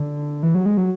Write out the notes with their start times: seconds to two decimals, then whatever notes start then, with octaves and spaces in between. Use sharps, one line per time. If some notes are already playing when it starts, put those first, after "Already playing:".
Already playing: D3
0.43 E3
0.55 F#3
0.66 G#3
0.77 F#3